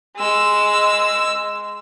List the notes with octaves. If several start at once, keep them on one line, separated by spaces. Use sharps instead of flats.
G#3 E6